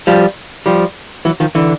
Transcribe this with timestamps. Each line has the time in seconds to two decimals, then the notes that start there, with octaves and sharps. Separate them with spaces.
0.07 F3 G3
0.66 F3 G3
1.25 E3 F#3
1.40 D#3 F3
1.55 D3 E3